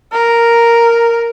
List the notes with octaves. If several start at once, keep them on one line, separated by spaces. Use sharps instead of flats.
A#4